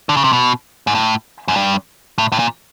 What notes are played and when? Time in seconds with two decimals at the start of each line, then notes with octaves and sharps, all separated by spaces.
0.09 D3
0.17 C#3
0.24 C3
0.33 B2
0.87 G#2
0.95 A2
1.48 F#2
1.56 G2
2.18 A2
2.32 A2
2.39 A#2